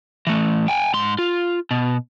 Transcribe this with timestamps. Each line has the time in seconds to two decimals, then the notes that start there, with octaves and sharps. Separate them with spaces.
0.27 E3 A3
0.68 G5 G#5
0.94 G#2 C6
1.19 F4
1.71 B2